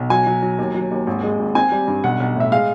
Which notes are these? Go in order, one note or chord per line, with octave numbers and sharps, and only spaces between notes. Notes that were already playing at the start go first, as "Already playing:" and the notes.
Already playing: B1
F#3 G#5
F#3
F#3
D#2
F#3
D#2
G#1
G#3
G#1
C4 G#5
G3
G2
B1 F#5
B1
A2 E5
G#3 F5